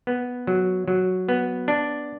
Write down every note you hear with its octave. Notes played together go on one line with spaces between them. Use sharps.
B3
F#3
F#3
B3
D4